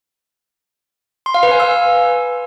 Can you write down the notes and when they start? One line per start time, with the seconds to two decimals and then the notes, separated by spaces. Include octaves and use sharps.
1.26 C6
1.34 F5
1.43 B4
1.51 G#5
1.60 E6